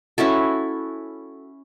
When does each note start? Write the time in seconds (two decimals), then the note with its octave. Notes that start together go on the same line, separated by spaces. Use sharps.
0.18 C#4 E4 F#4 A4